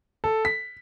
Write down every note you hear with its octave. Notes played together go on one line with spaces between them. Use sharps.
A4
B6